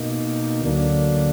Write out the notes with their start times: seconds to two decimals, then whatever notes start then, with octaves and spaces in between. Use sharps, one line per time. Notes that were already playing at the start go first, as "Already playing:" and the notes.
Already playing: B2 A#3 D#4
0.62 D2 D3 F#3 A#3 D4